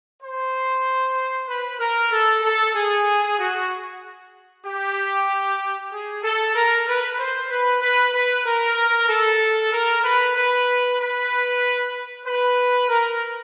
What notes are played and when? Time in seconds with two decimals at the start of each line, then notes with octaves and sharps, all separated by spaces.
0.22 C5
1.48 B4
1.80 A#4
2.12 A4
2.44 A4
2.75 G#4
3.39 F#4
4.65 G4
5.92 G#4
6.24 A4
6.55 A#4
6.87 B4
7.19 C5
7.50 B4
7.82 B4
8.14 B4
8.45 A#4
9.09 A4
9.72 A#4
10.04 B4
10.36 B4
10.98 B4
12.26 B4
12.89 A#4